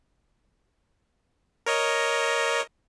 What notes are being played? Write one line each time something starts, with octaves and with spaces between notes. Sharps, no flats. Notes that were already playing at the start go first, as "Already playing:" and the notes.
A#4 C#5 D#5